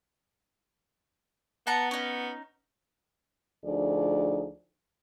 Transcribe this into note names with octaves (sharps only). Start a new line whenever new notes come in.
B3 F#5 A5 A#5
C#4 D#4
D2 F3 D4 D#4 G#4 D5